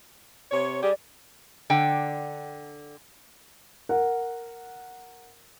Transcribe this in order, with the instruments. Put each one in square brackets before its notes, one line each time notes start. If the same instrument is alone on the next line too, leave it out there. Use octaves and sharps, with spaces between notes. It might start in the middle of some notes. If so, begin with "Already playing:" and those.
[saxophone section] C3 C#5
[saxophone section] G3 G4 G#4 [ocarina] D5
[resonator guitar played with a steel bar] D3 F#5 G5
[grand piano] A#4 F#5